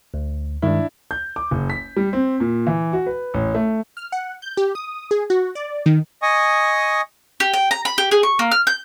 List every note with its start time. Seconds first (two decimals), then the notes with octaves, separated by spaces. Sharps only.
0.14 D2
0.62 G2 D#3 G#3 D4 E4
1.11 G6
1.36 D6
1.51 F#1
1.70 B6
1.97 G3
2.13 C4
2.40 A#2
2.67 E3
2.93 F#4
3.07 B4
3.34 A1
3.55 A3
3.97 F6
4.12 F#5
4.42 G6
4.57 G4
4.75 D#6
5.11 G#4
5.30 F#4
5.55 D5
5.86 D#3
6.22 D#5 G#5 C#6 D#6
7.40 G4
7.54 G5
7.71 A#5
7.85 B5
7.98 G4
8.11 G#4
8.23 C#6
8.39 A#3
8.51 F6
8.67 G6